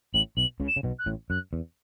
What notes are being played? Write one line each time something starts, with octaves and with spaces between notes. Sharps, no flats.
A1 A2 F#7
B1 B2 F#7
C#2 C#3
E7
C#3
B1 B2
F#6
A1 A2
F#2 F#6
E2